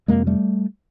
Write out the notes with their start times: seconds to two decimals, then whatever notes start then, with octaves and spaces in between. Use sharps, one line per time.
0.08 F2 C3 G#3 A#3
0.27 G3 A3